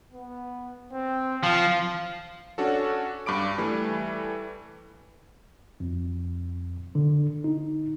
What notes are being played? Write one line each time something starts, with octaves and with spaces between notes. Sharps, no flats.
B3
C4
F3 F5
C#4 D4 F#4 A4
G2 B5 D6 D7
E3 G3 A3
F2
D3
D#4